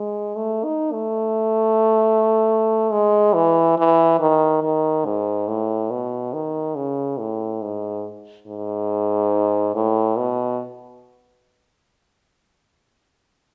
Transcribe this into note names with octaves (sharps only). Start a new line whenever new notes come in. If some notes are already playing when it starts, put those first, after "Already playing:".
Already playing: G#3
A3
D#4
A3
G#3
E3
E3
D#3
D#3
G#2
A2
B2
D#3
C#3
A2
G#2
G#2
A2
B2